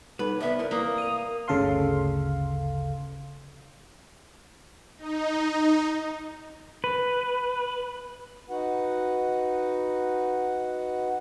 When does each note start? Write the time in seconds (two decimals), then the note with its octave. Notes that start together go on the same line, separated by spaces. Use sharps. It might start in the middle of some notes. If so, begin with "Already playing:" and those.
0.19 G3 D#4 A4 B4
0.41 C2 B3 E5
0.59 E4 A#4 D5
0.71 A#3 D#6
0.98 D#7 F7
1.48 G1 D2 C#3 A4 F5 C6
4.98 D#4
6.84 B4
8.50 D#4 F#4 B4 F#5